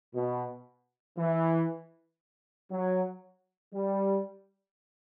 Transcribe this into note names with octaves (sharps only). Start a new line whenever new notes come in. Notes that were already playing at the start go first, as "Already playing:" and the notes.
B2
E3
F#3
G3